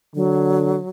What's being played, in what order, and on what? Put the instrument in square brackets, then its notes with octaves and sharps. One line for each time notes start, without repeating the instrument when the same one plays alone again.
[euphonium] D3 [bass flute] F#3